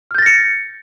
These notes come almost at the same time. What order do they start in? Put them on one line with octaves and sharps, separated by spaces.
F6 G6 A6 A#6 C#7